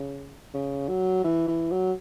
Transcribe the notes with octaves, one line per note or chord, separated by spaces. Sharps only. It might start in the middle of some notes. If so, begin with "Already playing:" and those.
Already playing: C#3
C#3
F#3
E3
E3
F#3